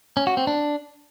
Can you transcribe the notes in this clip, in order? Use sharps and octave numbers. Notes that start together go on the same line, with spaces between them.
C#4
F#4
C4
D4